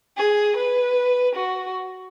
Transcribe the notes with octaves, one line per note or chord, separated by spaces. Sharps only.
G#4
B4
F#4